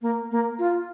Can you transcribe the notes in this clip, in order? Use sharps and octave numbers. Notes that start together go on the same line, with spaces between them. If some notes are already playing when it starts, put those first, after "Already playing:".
A#3
A#3
F4